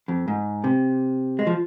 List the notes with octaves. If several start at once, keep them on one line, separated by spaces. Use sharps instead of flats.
F2
G#2
C3
G#3
F3